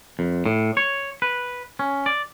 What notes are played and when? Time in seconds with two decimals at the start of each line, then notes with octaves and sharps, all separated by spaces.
0.19 F2
0.46 A2
0.77 C#5
1.22 B4
1.79 C#4
2.06 D5